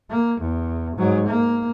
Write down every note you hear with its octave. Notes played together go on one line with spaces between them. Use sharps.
A#3
E2
G#2 F#3
A#3